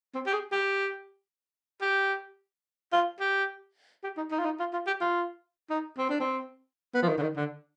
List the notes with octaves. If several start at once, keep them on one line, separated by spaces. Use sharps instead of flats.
C4
G4
G#4
G4
G4
F4
G4
G4
D#4
D#4
F4
D#4
F4
F4
G4
F4
D#4
C4
D4
C4
B3
F3
D#3
D3
D#3
D3